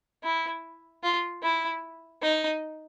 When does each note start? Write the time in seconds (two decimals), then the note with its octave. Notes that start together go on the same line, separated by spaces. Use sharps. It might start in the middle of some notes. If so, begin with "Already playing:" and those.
0.24 E4
1.03 F4
1.43 E4
2.22 D#4